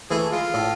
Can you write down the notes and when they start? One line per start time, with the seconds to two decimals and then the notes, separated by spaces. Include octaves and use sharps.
0.10 E3 A3 G#4
0.32 G#3 F4
0.54 A2